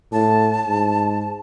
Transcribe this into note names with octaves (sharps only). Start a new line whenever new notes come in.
A2 A5
G#2